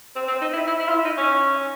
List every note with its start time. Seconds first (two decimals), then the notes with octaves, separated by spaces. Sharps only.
0.16 C4
0.28 C4
0.41 D#4
0.53 E4
0.67 E4
0.79 E4
0.88 F4
0.92 E4
1.05 D#4
1.17 C#4